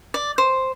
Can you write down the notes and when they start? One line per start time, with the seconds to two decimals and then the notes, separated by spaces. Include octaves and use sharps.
0.14 D5
0.38 C5